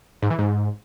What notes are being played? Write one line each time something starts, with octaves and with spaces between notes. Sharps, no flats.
G#2
E3
G#2